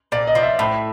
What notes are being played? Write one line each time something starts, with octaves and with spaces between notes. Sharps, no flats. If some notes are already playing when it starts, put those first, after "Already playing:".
A#2 D5
D#5
F3
E5
A2 E5